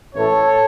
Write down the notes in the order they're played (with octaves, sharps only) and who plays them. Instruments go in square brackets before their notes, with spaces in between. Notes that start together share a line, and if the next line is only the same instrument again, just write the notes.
[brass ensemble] A1 A2 E3 A4 C#5